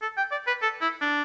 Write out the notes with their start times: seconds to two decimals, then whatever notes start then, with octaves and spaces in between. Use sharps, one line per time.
0.02 A4
0.17 G5
0.31 D5
0.47 B4
0.62 A4
0.81 E4
1.01 D4